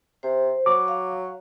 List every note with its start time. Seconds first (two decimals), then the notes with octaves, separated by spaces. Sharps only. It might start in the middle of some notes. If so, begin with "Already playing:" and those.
0.23 C3 C5
0.66 F#3 D6
0.88 F5